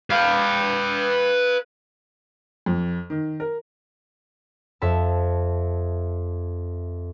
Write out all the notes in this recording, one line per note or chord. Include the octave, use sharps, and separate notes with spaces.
B4 F5
F2
D#3
A#4
F2 E5 A5